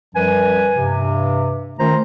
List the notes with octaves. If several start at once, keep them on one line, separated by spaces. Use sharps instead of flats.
F#2 F3 G3 B4 G#5
G2 C3
D#3 A3 C#4 F4 C5 A#5